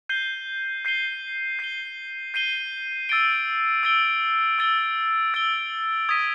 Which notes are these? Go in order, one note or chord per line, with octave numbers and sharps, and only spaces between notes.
G6 C7 D#7 G7
G6 C7 D#7 G7
G6 C7 D#7 G7
G6 C7 D#7 G7
E6 A6 D7 G7
E6 A6 D7 G7
E6 A6 D7 G7
E6 A6 D7 G7
D#6 G#6 B6 D#7